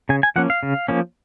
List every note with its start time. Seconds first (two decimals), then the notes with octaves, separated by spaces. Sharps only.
0.09 C#3 G#5
0.23 G#5
0.36 F3 A#3 C#4 F#5
0.50 F5
0.63 C#3
0.88 F3 A#3 C#4